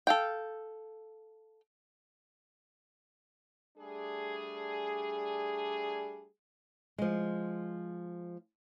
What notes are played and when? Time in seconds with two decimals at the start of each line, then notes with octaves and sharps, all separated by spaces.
0.07 A4 F5 G5
3.77 G3 A3 D4 G#4
6.98 F3 G#3